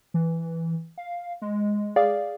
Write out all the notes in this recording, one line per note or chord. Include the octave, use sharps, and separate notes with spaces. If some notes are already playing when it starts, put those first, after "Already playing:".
E3
F5
G#3
G#4 D5 F5